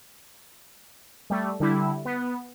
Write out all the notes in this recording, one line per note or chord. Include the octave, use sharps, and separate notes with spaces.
G3 A3
D3 G3 E4
B3